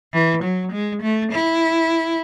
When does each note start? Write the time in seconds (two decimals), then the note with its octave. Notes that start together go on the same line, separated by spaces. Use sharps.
0.13 E3
0.43 F#3
0.72 G#3
1.02 A3
1.32 E4